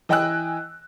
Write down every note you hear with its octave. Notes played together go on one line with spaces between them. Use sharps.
E3 D#5 G5 G#5 E6 F#6